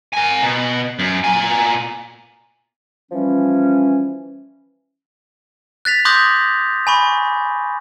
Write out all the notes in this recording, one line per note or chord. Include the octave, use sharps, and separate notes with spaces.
A#4 G#5
B2
F#2
A#2 G#5
E3 F3 G3 C#4
F#6 A6 B6 F7
C6 D6 D#6 F#6 G6 A#6
G#5 B5 C#6